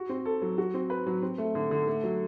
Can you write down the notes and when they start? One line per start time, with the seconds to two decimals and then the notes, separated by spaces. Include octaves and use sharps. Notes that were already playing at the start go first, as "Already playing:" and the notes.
Already playing: F#4
0.09 C4
0.25 A4
0.42 F#3
0.58 F#4
0.74 C4
0.90 B4
1.06 F#3
1.22 C4
1.38 A3
1.55 D3
1.71 D3
1.87 A3
2.04 F#3